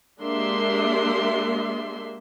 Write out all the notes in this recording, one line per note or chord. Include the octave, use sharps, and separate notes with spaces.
G#3 A#3 D4 G4 E5 C6